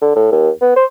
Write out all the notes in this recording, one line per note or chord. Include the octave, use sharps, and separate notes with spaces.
D3
A2
D#2
B3
C5